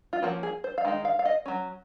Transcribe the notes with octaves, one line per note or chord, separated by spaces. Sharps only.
F4
F3 A#3 C#4 F#4
G#4
C5
F5
D#3 G#3 D#4
F5
F5
D#5
F#3 C#4